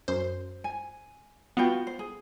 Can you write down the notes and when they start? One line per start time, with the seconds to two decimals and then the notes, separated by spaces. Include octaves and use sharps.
0.08 F#2 C5
0.64 G#5
1.57 B3 F4 F#4 G5
1.87 C5
1.99 G#4